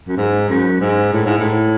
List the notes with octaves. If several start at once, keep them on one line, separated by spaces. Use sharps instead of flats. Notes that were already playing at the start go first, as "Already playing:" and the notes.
F#2
G#2
F#2
G#2
A2
G#2
A2